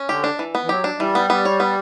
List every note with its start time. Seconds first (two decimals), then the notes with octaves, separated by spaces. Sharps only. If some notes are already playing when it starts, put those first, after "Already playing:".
Already playing: C#4
0.09 D3 G4
0.24 D4
0.39 E3
0.55 B3
0.64 E3
0.69 F#3 G4
0.84 D4
0.99 E3 G3
1.15 B3
1.30 B3
1.45 C#5
1.60 B3